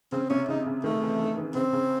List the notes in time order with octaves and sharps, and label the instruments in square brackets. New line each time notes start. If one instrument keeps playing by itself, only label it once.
[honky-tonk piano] C#3 [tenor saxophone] C4
[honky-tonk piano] C3 [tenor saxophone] C#4
[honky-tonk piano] C#3 [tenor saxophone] D#4
[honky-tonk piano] C#3
[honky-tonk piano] D#3 [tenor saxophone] A3
[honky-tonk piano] E3
D#3
D#3
[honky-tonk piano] C#3 [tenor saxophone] C4
[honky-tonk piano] C#3